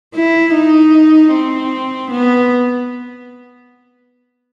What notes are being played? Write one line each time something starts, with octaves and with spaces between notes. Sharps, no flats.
E4
D#4
C4
B3